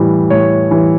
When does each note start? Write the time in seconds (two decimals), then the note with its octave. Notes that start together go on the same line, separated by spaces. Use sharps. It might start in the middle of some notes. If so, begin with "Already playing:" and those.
Already playing: A2 E3 G3
0.30 A2 C#5
0.71 E3 G3